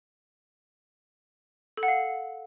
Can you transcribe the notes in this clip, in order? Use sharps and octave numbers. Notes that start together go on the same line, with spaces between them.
A4
F#5
F5